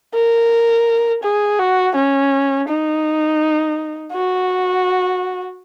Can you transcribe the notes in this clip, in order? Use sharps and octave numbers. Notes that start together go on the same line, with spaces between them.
A#4
G#4
F#4
C#4
D#4
F#4